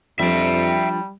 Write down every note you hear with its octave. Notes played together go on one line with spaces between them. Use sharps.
F2 F3 G3 D4 E5 G5